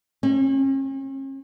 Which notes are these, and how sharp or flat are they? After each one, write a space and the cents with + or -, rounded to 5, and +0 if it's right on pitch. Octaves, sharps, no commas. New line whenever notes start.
C#4 -40